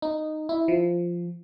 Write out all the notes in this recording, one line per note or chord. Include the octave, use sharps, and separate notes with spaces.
D#4
E4
F3